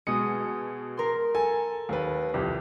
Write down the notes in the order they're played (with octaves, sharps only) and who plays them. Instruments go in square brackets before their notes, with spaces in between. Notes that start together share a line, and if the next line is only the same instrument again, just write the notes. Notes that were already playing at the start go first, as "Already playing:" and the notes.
[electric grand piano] B2 C#7 [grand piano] G#3 [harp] D#6
[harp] A#4 C6
[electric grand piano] A4 [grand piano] G#5
[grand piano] D#2 B4
[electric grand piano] C2 F2 [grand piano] G4